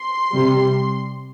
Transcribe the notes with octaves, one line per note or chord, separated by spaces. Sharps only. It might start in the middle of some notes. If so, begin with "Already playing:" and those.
Already playing: C6
C3 G3